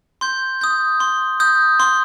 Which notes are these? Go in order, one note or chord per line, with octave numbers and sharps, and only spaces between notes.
C6 G6
D#6 G6
C6
D#6 G6
C6